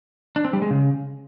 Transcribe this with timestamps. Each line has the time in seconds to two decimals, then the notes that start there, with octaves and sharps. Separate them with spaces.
0.36 D4
0.45 C4
0.53 G3
0.62 G#3
0.71 C#3